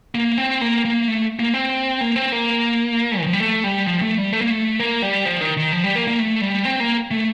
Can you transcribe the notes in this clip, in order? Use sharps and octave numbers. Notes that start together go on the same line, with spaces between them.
A#3
C4
A#3
A#3
A3
A#3
C4
A#3
C4
A#3
D#3
F3
G3
A3
G3
F3
A3
G3
A3
A#3
A3
A#3
G3
F3
D#3
D#3
F3
G3
A#3
A#3
A3
G3
C4
A#3
A3